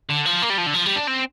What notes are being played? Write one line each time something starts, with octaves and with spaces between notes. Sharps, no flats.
D3
F3
A#3
G3
F3
D3
F3
G3
D4
C4